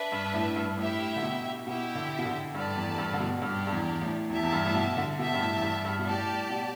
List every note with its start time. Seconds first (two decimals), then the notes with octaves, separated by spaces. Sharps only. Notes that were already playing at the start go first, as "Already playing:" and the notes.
Already playing: D4 B4 E5
0.12 G2
0.34 A2
0.56 G2
0.77 A2 E4 G4 E5 G5
1.16 D3
1.23 B2
1.66 B2 E4 G4 E5 G5
1.95 D3
2.19 B2
2.25 D3
2.54 G2 A3 G4 B4 D5 A5
2.76 E2
2.98 G2
3.13 D3
3.20 B2
3.42 G2 D4 G4 D5
3.67 G2
3.72 E2
4.01 A2
4.30 E2 G4 E5 A5
4.43 E2
4.52 G2
4.65 A2
4.75 B2
4.97 D3
5.18 B2 G4 E5 A5
5.34 G2
5.40 A2
5.56 E2
5.62 G2
5.85 G2
5.99 B2
6.06 A2 G4 D5 A5
6.50 B2